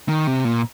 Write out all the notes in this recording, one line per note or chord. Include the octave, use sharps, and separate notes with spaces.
D#3
C3
A#2